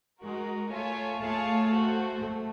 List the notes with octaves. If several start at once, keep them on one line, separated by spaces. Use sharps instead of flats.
G#3 D#4 F#4 A#4
A3 F4 A4 C#5 E5 G#5
A3 F4 G#4 C#5 F5 A5
F#4 A4 C5
A3